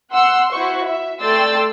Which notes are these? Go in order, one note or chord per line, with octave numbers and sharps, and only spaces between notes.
F#5 C6 E6
E4 F#4 C5 C#6
E5
A3 D5 G5 C6 E6 A6